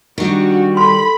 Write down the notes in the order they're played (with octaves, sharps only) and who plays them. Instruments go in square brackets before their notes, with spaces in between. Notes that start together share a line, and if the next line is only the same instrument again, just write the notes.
[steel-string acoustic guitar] D#3 G3 [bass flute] D4 [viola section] F#4
[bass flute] A4 [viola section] B5 [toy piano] C6